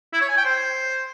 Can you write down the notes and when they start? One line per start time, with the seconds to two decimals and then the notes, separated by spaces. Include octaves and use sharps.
0.13 E4
0.21 C#5
0.29 G#5
0.37 G5
0.45 C5